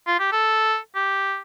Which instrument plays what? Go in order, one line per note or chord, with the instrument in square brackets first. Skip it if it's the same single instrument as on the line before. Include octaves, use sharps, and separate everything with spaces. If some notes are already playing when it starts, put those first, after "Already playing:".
[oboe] F4
G4
A4
G4